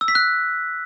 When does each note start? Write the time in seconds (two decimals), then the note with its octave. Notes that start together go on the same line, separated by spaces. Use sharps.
0.01 E6
0.08 B6
0.15 F#6